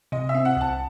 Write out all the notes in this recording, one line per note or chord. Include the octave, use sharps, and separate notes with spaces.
C3 D#5
E5
C4
F#5
C2 A5